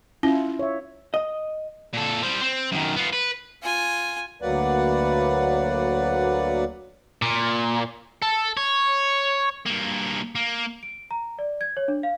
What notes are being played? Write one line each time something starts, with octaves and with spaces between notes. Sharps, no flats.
C#4 E4 F4
C#5 E5
D#5
A#2 A4
G3 C5
C4
F#2 D#3
B3 F4
B4
F4 G#5
D2 F#3 A#3 B4 D5 F#5
A#2
A4
C#5
G2 A#3
A#3
D7
A#5
D5
G#6
C#5
D4
F5